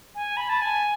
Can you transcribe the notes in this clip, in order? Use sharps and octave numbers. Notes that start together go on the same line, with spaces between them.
G#5
B5
A5
G#5